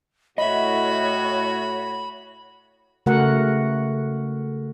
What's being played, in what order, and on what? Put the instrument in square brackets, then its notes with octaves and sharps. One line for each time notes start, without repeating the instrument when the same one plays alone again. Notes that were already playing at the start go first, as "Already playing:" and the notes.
[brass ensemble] A2 F#4 [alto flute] C#5 [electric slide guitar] D#5 E5 [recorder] B5
[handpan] C#3 A3 F#4 A#4 F#5